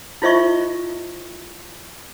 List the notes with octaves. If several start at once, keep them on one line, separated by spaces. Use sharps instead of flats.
E4 F4 C5 D#5 E5 C#6